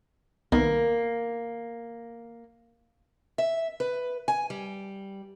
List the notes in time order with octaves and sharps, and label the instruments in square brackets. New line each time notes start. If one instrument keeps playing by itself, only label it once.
[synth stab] C2 D#3 B3 [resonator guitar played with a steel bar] A#3
[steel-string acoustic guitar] E5
B4
G#5
G3